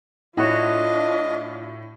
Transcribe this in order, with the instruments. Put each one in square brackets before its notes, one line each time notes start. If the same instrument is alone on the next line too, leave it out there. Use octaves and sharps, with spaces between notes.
[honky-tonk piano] A2 [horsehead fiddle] D4 F4 [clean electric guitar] F#4 C#5 [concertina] D#5